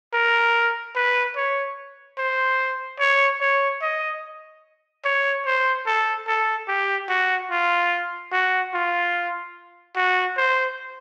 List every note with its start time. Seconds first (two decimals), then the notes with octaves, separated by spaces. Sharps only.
0.14 A#4
0.95 B4
1.36 C#5
2.18 C5
2.99 C#5
3.41 C#5
3.82 D#5
5.05 C#5
5.46 C5
5.86 A4
6.27 A4
6.68 G4
7.09 F#4
7.51 F4
8.32 F#4
8.74 F4
9.97 F#4
10.37 C5